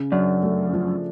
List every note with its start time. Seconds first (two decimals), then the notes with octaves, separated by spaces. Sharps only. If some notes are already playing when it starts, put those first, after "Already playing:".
Already playing: C#3
0.12 F#2 D4
0.43 A3
0.73 F3